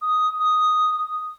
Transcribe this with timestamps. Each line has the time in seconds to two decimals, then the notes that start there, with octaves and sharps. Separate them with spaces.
0.02 D#6
0.40 D#6